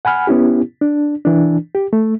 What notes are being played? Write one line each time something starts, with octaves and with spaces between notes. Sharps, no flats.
F#5 G#5 B5 F6
B3 C#4 E4 G4
D4
E3 D4
G4
A3